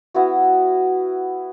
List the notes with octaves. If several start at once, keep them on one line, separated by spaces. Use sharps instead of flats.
B3 E4 F#4